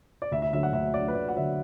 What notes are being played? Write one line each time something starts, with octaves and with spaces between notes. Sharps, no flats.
D5
D2 E5
E5
D3 F#3 E5
F#5
D2 E5
D3 F#3 D5
B4
D2 D5
F#5
D3 F#3 E5